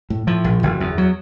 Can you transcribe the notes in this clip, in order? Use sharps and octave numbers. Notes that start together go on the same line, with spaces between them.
A2
A2 F3
A#1
F#1
E2
F#3